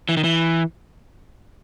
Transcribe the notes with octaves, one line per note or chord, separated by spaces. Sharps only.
E3
D#3
E3